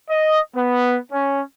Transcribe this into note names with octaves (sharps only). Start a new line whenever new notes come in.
D#5
B3
C#4